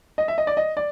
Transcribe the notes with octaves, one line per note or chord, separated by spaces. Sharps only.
D#5
E5
D#5
D5
D#5
D5